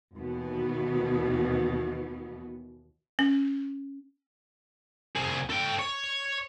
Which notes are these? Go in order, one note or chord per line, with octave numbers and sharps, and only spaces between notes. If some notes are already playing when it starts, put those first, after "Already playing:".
D#2 B2 E3 B3
C#4
C2 G#4
A4 G5
C#5